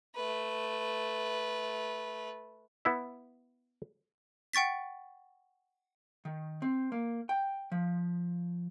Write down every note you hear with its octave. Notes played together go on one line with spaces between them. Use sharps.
A3 B4
B3 E4 E5
F#5 G5 C#6 A6 B6
D#3
C4
A#3
G5
F3